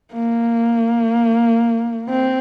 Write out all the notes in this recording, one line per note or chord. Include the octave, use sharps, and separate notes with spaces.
A#3
C4